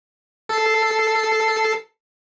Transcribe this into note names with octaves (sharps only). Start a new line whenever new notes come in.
A4 C7